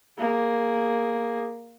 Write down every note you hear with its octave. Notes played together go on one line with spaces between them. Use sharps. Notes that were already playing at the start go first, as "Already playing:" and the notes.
A#3 G#4